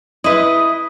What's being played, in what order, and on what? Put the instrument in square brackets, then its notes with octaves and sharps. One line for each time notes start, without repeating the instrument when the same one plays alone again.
[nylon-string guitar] E4 [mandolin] B4 D#5